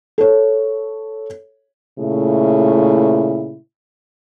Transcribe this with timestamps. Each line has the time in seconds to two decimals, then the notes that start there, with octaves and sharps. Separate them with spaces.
0.18 A4 C#5
1.99 A#2 C#3 A3 E4